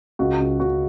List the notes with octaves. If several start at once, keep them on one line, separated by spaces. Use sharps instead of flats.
C#2 F#4
C#2
C#3 F#4